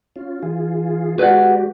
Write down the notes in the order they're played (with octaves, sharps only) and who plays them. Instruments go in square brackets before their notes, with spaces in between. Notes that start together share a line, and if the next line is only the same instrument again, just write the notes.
[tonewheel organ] C#4 F4
E3 F4 G#4
[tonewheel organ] G#3 F#4 G4 [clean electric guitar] B4 D5 F#5